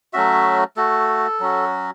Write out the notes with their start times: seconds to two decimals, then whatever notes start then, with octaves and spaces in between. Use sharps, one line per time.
0.13 F#3 A3 C#4 F#4 E5
0.77 A3 F#4 A4
1.40 F#3 C#4 F#4